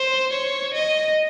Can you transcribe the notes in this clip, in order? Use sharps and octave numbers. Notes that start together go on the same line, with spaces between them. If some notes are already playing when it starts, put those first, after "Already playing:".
Already playing: C5
C#5
D#5